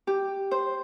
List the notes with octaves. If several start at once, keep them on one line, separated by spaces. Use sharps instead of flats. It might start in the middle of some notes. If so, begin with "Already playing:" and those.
G4
C5